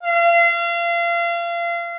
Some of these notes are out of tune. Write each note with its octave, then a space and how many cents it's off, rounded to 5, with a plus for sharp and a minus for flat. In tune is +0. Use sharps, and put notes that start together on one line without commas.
F5 -30